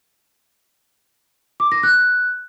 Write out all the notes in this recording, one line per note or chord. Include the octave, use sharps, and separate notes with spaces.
D6
A#6
F#6